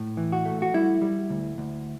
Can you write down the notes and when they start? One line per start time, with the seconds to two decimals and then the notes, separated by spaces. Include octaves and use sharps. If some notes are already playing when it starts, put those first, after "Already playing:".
Already playing: A2
0.17 E3
0.32 F#4
0.45 A3
0.62 F#4
0.74 G3 E4
1.02 G3
1.30 D2
1.58 D2